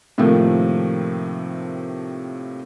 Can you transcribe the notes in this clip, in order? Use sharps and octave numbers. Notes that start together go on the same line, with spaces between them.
A2 C3 D#3 F3 A3 A#3